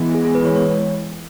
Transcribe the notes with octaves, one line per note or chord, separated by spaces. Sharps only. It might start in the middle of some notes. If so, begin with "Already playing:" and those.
Already playing: E3 G#3 B3
G#4
G#4
B4
C#5
C#5